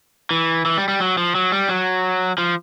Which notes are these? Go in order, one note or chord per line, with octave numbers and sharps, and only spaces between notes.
E3
E3
G3
G3
F#3
F3
F#3
G3
F#3
F3